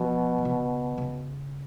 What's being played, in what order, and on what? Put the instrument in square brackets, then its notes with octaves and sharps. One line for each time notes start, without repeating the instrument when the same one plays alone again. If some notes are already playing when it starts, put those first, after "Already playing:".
Already playing: [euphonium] B2 [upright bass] F3
[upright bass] D3
C#3
C#3